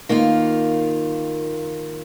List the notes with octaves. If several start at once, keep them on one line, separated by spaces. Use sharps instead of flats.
D#3 A#3 F4